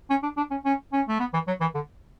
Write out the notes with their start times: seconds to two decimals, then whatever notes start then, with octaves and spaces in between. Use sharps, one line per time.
0.10 C#4
0.23 D4
0.37 D4
0.51 C#4
0.65 C#4
0.93 C#4
1.08 A3
1.20 B3
1.33 E3
1.47 F#3
1.61 E3
1.75 D3